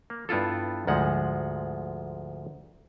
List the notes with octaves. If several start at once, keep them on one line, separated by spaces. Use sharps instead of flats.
A#3
G2 B3 E4 F4 A4
D2 G#2 F3 G#3 F#5